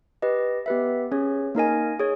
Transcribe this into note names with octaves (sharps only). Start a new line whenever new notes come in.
G4 B4 D#5
B3 G4 B4 E5
C#4 G#4 C#5
A#3 D#4 A#4 D#5 G#5
G#4 C#5